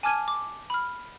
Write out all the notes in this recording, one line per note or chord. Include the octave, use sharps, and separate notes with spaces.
G#5 A5 D6 F6 G#6 D#7
D6
B5 F6